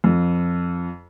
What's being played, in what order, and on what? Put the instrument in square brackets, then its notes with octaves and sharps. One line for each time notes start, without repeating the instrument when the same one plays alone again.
[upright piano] F2